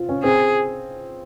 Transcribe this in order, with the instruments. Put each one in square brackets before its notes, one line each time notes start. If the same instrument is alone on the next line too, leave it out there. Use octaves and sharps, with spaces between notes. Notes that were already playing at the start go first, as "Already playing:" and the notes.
Already playing: [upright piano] C4 F4
C#4
[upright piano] C4 [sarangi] G#4